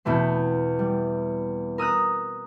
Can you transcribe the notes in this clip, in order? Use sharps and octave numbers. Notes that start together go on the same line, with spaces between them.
E2 B2 A3 C4
G3
A#4 D#6 E6 F#6